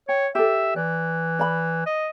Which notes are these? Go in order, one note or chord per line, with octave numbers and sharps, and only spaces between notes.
C#5 G5
G4 A4 E5
E3 D5
D5 B5
D#5